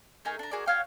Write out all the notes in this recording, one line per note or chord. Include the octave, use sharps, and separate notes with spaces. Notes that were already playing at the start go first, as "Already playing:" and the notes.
A3 D#4 G#4 A#4
D4 A#5
F#4 G#4 A#4 D5
F#4 C#5 F5 G5